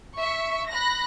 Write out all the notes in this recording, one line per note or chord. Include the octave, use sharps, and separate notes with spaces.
E5 C#6
B5 F#6 A#6